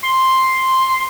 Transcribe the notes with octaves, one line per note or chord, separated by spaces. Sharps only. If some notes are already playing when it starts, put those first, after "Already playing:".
C6